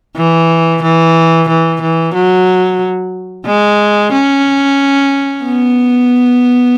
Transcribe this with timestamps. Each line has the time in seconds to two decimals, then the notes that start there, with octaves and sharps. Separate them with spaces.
0.16 E3
0.82 E3
1.49 E3
1.81 E3
2.14 F#3
3.46 G#3
4.12 C#4
5.44 B3